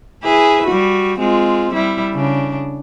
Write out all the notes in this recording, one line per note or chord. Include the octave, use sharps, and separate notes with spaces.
E4 G#4 B4
G3 F#4
G#3 C4 F4
G3 E4
C#3 D4